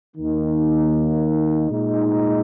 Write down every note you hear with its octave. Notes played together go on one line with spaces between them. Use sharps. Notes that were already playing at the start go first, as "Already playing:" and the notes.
D#2 D#3 A#3 D#4
A#2 G#3 D#4